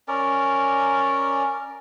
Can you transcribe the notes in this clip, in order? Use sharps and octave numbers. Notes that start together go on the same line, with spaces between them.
C#4 A#4 D5